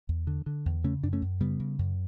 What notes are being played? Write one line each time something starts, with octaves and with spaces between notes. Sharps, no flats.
E2
D3
D3
E2
C#3 A3 C#4
F#2 D4
A3 C#4
F#2
C#3 G3 B3
C#3
F#2